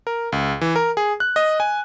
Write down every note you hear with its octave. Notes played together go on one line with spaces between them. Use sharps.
A#4
C#2
E3
A#4
G#4
F#6
D#5
G#5